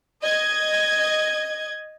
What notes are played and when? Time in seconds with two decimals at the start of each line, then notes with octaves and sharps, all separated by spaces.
0.22 D#5 G#6